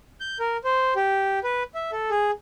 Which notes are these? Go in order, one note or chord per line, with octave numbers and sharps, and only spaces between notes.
G6
A#4
C5
G4
B4
E5
A4
G#4